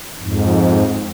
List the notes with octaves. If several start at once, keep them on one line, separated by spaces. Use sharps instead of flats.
F2 G#2